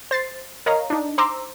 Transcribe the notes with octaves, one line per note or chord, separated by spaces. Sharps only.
C5 A6 C7
A#4 C#5 D#5 F5 A#5
D4 D#4
C5 A#5 C6 D6 E6